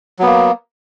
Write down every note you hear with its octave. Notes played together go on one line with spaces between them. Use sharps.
F#3 A#3 B3